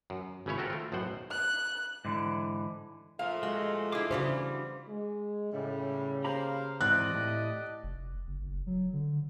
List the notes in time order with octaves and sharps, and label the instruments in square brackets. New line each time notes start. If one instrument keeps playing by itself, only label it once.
[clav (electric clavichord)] F#2
G#1 C#3 C#4 E4 C#5
C4 F4 F#4 A4 A#4
A3 F4
B1 F#2 A2 C5 F#5
[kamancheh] F#6
[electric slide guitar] G#2 D3 E3
[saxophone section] A#2 F3 A3 [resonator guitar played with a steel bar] F5
[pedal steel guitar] G#3 [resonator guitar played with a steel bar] F#4
[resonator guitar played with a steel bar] E4 G#4 [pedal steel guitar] D6
[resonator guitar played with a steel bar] C#3 E3 G3 [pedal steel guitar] D4 [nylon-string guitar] F#4 C5
[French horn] G#3
[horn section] A2 G3 [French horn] C#3
[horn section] A#3 C5 F5 [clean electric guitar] G4 A#5 B5
[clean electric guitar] G#2 E3 C4 [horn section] G4 D5 D#5 [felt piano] F#6
[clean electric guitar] A2
[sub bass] F1
F#1
F#1
F#3
D3